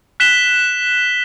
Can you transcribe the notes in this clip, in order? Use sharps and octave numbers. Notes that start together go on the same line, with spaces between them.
F#6 B6 E7 G7